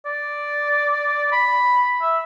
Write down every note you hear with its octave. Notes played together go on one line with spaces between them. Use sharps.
D5
B5
E5